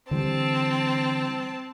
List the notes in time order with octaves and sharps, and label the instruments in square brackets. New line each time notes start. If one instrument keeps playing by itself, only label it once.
[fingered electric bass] D3 E3 G3 [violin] C4 A5